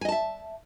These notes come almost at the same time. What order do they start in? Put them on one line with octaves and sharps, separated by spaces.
G#5 D#5 A5 E5